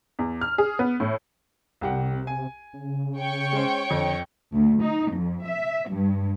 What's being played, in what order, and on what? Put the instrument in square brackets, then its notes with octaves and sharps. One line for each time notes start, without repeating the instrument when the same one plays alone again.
[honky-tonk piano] E2
F6
G#4
B3
A2
[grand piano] C2 G4 F#5 [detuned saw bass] C3
[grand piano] G#5
[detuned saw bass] C#3
[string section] C#5 G5 C#6
[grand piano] G#3 C#4 C5
[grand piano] F2 [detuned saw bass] D3
[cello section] D2
D#4
F2
E5
G2